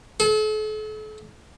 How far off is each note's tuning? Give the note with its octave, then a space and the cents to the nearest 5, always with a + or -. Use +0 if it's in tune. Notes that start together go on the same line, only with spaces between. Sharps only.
A4 -40